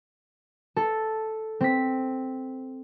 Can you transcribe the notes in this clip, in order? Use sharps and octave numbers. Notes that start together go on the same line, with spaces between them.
A4
C4 B6